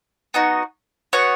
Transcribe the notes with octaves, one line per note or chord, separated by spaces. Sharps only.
B3 D#4 F#4
B3 F#4 C#5 F#5